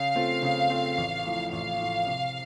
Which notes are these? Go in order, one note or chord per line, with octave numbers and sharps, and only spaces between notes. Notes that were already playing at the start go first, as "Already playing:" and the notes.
Already playing: C#3 F5
A3 C4 F4
C#3
A3 C4 F4
A1
A2 F3
A1 F5
A2 F3
C3